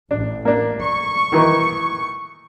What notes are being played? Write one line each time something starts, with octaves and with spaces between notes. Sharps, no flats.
A1 D4
A#3 D4
C#6
D#3 E3 D#4